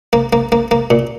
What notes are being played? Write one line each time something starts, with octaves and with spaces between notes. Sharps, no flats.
A#3
A#3
A#3
A#3
A#2